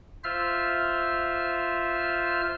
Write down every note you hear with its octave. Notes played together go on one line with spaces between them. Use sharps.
F4 C5 E5 F6